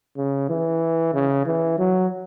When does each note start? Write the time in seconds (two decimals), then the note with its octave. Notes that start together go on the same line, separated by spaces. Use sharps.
0.17 C#3
0.50 E3
1.14 C#3
1.46 E3
1.79 F#3